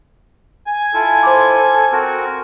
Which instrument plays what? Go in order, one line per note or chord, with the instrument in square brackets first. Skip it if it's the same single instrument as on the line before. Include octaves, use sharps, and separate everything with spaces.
[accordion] G#5
[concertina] E4 F4 [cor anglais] A4
[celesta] C5 C6 D6
[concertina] C4 F#4 A#4